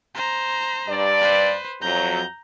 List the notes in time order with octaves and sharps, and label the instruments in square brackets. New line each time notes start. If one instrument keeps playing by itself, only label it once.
[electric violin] C5 A#5
[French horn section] G2 D5
[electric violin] B4 C5
[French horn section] F2 F#3 [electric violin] A#5 G6